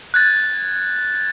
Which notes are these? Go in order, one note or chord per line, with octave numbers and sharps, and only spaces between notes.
F#6 G#6 A6